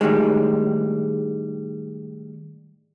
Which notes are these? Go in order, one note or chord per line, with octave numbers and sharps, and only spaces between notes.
A2 C3 D#3 G3 G#3